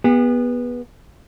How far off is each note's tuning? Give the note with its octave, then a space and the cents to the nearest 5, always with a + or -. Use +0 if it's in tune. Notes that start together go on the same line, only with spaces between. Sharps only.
B3 -15 G#4 -45